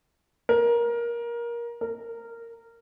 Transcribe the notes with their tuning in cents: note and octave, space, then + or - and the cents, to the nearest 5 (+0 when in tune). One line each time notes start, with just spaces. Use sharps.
A#4 +20
A#4 -15